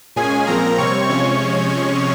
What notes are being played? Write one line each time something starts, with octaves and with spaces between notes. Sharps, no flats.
A#2 G#3 C#4 G#4 G#5
A#2 F3 C4 A#4 A#5
C3 G3 C4 C#5 C#6
C3 F3 G#3 C#4